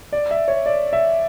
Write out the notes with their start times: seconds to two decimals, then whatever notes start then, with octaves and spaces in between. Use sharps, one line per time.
0.13 D5
0.31 E5
0.48 C#5
0.66 D5
0.93 E5